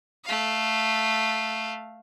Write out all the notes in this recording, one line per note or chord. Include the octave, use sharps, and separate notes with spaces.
A3 F5